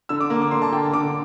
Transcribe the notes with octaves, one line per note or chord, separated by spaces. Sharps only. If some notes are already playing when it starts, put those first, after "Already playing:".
D3 E6
D6
A#3
D6
D3 C6
A5
D3 G5
D3 D6